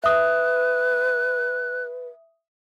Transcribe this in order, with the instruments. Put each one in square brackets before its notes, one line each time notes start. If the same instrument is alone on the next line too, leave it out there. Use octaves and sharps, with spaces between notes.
[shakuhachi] B4 [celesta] E5 D#6 [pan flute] F#6